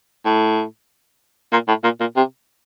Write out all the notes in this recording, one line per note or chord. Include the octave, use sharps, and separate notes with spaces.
A2
A#2
A2
A#2
A#2
C3